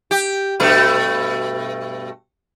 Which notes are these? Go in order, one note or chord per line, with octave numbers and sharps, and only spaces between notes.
G4
G2 B2 A3